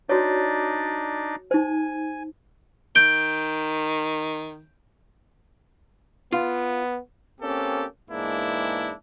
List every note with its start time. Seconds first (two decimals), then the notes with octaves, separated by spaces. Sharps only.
0.09 D4 D#4 F#4 C#5 D5
1.51 D#4 C5 G#5
2.95 D#3 G6 D7 G7
6.33 B3 F4
7.41 A#3 C4 C#4 G4 A4
8.10 E2 G#2 A#3 D4 E4